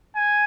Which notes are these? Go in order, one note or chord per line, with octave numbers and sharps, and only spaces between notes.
G#5